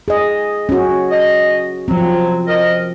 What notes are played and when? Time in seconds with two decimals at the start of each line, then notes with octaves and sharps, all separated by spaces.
0.08 G#4 D#5
0.69 C#4 F#4
1.11 D#5
1.88 F3 F#3 C4
2.48 A#4 D#5